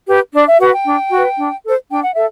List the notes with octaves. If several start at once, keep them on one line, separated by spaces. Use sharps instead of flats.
G4 B4
D4 D5
E5
F#4 B4 F#5
G5
D4
F#4 B4
D4
A4 C5
D4 G5
F#5
A4 E5